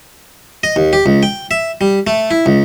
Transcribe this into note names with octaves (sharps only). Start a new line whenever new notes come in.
D#5
D#2
G4
C#2
G5
E5
G3
A3
E4
C#2